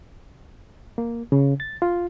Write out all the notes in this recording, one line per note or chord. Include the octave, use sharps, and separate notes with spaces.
A#3
C#3
A6
F4